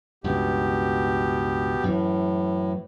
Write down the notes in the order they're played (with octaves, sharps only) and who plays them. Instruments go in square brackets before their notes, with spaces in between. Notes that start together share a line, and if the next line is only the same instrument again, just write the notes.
[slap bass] C#2 G2 [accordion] B2 B3 G4
[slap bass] F#2 E3 [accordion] A2